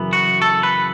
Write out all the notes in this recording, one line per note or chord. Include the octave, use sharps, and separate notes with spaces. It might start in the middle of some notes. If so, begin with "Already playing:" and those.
Already playing: F#2 C#3 E3 B3
F#4
A4
B4